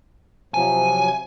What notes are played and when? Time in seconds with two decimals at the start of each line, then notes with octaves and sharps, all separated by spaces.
0.54 C3 F3 F#3 G#5